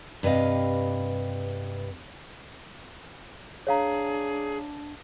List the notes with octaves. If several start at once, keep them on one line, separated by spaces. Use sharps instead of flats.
G2 C3 B4 D#5 F5
D4 G#4 C#5 F5 A#5